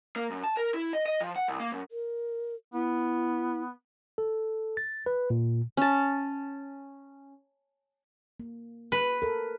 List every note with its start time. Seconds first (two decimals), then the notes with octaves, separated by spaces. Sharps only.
0.16 A#3
0.30 F#2
0.44 A5
0.57 A#4
0.74 E4
0.93 D#5
1.06 D#5
1.20 F3
1.36 F#5
1.48 C2
1.60 A#3
1.72 F#2
1.92 A#4
2.73 B3 E4
4.18 A4
4.77 A6
5.06 B4
5.30 A#2
5.77 C#4 A5
8.40 A#3
8.92 B4
9.22 A4 A#4